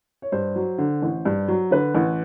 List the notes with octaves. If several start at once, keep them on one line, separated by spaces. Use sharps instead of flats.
C#5
G2 C5
F#3
D3
A1
G2
F#3
D3 B4
A1